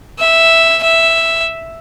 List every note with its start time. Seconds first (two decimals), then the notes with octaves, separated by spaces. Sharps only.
0.19 E5
0.84 E5